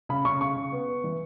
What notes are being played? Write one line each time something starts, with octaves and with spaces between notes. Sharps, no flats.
C#3 B5
C#3 C#6
C#3 C#6
C#3
B3
B3
E3